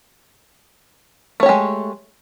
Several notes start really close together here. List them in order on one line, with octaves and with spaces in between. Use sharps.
A3 C#5 G4 G#3